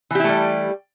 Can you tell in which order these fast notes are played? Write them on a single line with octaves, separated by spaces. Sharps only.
E3 G4 E4 A3 G3